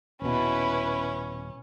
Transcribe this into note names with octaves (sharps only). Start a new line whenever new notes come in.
D#1 B2 C#4 E4 B4